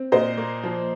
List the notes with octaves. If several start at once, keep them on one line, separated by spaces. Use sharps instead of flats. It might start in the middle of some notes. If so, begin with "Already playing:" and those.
Already playing: C4
A#2 C5 D#5
A#3
F3